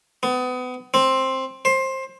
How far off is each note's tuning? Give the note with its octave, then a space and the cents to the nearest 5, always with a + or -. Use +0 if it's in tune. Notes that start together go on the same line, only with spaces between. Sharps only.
B3 +30
C4 +10
C5 +20